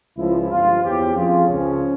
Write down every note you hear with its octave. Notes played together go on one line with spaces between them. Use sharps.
C#2 C#3 F3 E4
G1 G2 F3 F4
E2 C#3 F3 G4
F2 C#3 F3 F4
C#2 C#3 F3 C#4